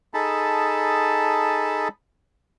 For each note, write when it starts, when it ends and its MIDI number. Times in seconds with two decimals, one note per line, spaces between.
0.14 1.88 63
0.14 1.88 68
0.14 1.88 69
0.14 1.88 81
0.14 1.88 83